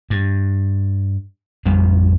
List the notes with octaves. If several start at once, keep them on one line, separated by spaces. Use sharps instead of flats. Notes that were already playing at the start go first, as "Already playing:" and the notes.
G2
A1 F2 G3 B3